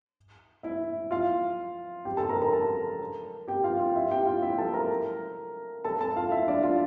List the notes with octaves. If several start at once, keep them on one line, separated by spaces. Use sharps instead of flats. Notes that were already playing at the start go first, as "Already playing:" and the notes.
E4 E5
F4 F5
G4 G5
A4 A5
A#4 A#5
A#4 A#5
A4 A5
G4 G5
F4 F5
F4 F5
E4 E5
G4 G5
F4 F5
E4 E5
A4 A5
A#4 A#5
A4 A5
A4 A5
F4 F5
E4 E5
D4 D5
F4 F5